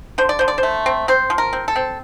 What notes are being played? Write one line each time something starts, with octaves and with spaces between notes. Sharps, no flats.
D3 C5
D5
D3 C5
D5
C5
A3
C4
C4 C5
F3
A#4
C4
A4
C4